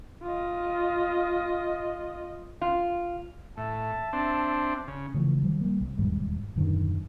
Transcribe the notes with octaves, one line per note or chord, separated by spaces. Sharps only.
F4 D#5
F4
A2 E5 A5
C4 D4
C#3
C#3 E3 F3 A3
D#3 F#3 G3
G3 A#3
C2
E1 D#2 G#2 G3
D#1 F#2 D3 D#3